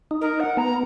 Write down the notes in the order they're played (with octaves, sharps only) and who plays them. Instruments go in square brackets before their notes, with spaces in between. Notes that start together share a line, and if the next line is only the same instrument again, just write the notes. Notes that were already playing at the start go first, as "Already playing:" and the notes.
[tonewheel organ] D#4
[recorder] A#4
F#5
[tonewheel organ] B3 [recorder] A#5